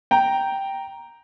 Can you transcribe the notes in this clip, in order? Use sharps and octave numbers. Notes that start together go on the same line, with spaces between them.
G5 A#5